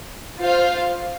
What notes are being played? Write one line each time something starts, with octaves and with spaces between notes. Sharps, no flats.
F4 C5 F5